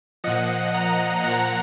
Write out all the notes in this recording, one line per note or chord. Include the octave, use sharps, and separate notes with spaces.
A#2 F3 D#5 F#5
F#5 A#5
A#2 F3 F#5 A#5